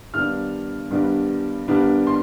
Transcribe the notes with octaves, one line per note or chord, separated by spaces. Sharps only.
G2 D#3 G3 B3 D4 F6
G2 D#3 G3 B3 D4
G2 D#3 G3 B3 D4
C6